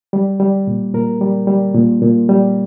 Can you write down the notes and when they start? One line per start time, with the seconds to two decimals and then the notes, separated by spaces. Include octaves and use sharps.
0.13 G3
0.40 G3
0.67 A#2
0.94 A#2 A#4
1.21 G3
1.47 G3
1.74 A#2
2.02 A#2
2.29 G3